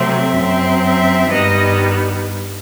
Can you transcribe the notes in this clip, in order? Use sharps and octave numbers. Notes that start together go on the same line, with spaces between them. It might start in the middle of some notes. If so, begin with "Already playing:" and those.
Already playing: C3 F#3 A3 C4 E5
F#2 F#3 C4
E5
G2 D#3 G3 B3 D#5